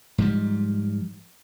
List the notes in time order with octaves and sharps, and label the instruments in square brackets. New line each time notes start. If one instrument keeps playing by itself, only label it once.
[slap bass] G#2 F3 G3